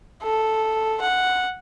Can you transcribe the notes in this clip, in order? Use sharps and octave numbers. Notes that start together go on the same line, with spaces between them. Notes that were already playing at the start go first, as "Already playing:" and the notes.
A4
F#5